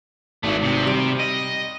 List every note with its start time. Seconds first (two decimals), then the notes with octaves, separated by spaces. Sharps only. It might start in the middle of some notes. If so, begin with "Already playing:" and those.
0.43 G#1 E3 A3
0.62 C3
0.86 G3 D7
1.20 D#5